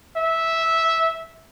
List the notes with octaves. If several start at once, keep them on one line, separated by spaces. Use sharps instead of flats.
E5